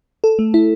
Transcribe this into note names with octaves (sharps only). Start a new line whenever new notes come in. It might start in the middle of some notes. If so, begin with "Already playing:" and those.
A4
A3
E4